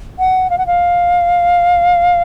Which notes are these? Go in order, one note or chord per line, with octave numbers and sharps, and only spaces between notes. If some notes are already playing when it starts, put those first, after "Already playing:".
F#5
F5
F#5
F5